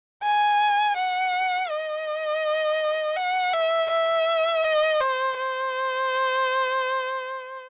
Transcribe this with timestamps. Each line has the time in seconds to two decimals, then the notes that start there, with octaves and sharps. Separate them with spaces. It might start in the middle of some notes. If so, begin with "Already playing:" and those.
0.23 G#5
0.96 F#5
1.70 D#5
3.17 F#5
3.53 E5
3.90 E5
4.64 D#5
5.00 C5
5.37 C5